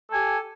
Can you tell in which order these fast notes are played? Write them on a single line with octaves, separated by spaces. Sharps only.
A4 G#5 G4